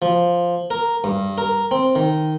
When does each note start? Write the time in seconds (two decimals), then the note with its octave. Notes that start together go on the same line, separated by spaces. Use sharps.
0.02 F3
0.70 A#4
1.04 G2
1.38 A#4
1.71 C4
1.95 D#3